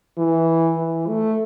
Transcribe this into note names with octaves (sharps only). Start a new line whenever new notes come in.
E3
E3
A3